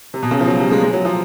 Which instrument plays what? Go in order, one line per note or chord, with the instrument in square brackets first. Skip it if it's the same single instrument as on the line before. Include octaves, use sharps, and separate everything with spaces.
[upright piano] C3
B2
C#3
F3
F#3
G3
G#3
G#3
F#3
F3